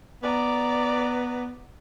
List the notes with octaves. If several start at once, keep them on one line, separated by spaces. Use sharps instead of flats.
B3 D5 A#5